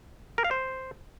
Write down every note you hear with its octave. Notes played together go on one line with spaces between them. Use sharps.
A#4
F5
C5